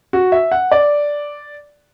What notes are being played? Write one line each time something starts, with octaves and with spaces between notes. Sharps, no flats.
F#4
E5
F#5
D5